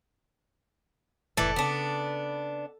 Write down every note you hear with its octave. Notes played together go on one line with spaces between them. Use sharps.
F1 A2 E3 A4 D5
C#3 B3 D4